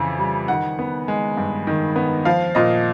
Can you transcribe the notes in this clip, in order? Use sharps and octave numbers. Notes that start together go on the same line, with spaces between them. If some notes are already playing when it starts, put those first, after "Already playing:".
Already playing: F2 C#3 E3
G3
D#3 F#5
B3
G#3
G2
D#3
B3
F3 F5
A#2 D#5